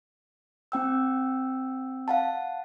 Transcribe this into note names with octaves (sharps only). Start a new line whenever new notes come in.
C4 G5 E6
F5 F#5 A5